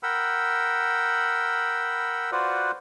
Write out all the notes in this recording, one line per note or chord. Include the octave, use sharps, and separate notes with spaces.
A#4 F#5 G5 B5 E6
F4 F#4 B4 C5 D5 F#5